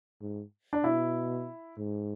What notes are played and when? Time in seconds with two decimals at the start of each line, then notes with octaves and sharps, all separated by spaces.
0.21 G#2
0.73 D4
0.84 B2 E4
1.78 G#2